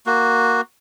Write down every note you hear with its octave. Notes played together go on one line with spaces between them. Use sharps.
A#3 F#4